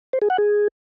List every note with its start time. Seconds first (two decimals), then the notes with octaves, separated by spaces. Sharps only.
0.13 C5
0.22 G#4
0.30 F#5
0.38 G#4